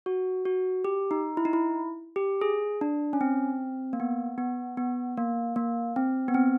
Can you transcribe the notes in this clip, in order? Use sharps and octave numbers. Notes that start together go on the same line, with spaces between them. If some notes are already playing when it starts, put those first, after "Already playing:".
F#4
F#4
G4
D#4
E4
D#4
E4
G4
G#4
D4
C#4
C4
A#3
B3
B3
B3
A#3
A#3
C4
B3
C4